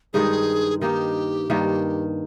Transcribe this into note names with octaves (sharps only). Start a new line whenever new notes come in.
G2 D#3 G#3 D#4 G#4
D#3 A#3 D#4 G4
G2 D#3 A#3